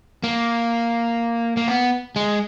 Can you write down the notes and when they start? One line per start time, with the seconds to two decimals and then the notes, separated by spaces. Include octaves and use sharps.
0.24 A#3
1.57 A#3
1.68 B3
2.16 G#3